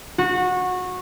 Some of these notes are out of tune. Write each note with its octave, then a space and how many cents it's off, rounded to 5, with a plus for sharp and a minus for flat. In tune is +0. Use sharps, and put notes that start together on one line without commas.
F#4 -20